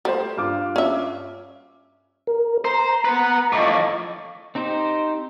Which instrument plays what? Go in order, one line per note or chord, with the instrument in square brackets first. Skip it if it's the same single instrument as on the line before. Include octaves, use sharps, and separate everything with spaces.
[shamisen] G3 [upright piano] A3 C5
[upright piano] G2 F4 D6
[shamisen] C#4 E5
[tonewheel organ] A#4
[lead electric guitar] C5 [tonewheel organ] A#5
[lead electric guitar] B4 F#5
[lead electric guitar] A2 F3 [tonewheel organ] D#5 C#6 D6
[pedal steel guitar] C4 D#4 G4 C5